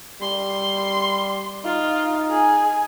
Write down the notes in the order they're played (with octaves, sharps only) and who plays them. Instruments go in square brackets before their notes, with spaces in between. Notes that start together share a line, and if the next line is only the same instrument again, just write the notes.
[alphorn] G3 [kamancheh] C6
[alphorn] D#4 [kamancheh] F4
[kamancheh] G#4 G#5